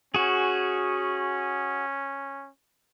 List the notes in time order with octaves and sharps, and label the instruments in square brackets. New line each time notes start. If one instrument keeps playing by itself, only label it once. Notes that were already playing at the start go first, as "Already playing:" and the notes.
[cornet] C#4 [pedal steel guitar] F#4 G#4